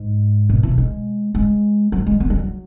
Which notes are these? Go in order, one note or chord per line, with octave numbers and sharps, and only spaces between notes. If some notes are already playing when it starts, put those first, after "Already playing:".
Already playing: G#2
B2
E3
G#3
G#3
F#3
G#3
B3
G#3
F#3